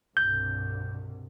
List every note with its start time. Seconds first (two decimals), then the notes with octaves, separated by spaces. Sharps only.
0.17 C2 G2 B2 G6